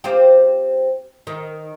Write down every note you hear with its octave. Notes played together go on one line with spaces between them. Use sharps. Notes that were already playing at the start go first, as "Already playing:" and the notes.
C4 F4 G4
D#3